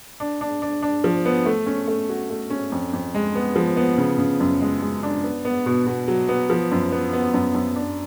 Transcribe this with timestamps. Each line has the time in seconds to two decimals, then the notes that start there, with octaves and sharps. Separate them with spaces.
0.20 D4
0.41 D4
0.62 D4
0.82 D4
1.04 F3
1.25 B3
1.46 A3
1.66 C#4
1.88 A3
2.09 F#4
2.30 A3
2.50 C#4
2.72 F2
2.93 F2
3.15 G#3
3.35 B3
3.56 F3
3.77 B3
3.98 C#3
4.18 C#3
4.40 F#2
4.61 G#3
4.82 G#3
5.03 D4
5.24 B3
5.45 B3
5.66 B2
5.87 B2
6.08 F#3
6.29 B3
6.50 F3
6.72 F#2
6.92 B3
7.13 B3
7.34 F#2
7.54 F#2
7.76 D4